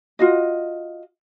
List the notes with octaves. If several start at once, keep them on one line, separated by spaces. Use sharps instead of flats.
F4 F#4 D#5